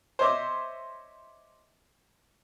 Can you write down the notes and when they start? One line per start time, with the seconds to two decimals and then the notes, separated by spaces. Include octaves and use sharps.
0.19 C5 C#5 D#5 E5 D6